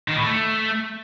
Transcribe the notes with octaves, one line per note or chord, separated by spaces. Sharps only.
D#3
A2
A3